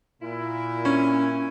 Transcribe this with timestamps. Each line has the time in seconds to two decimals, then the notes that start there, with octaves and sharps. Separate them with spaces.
0.22 A#2 E4
0.85 C#4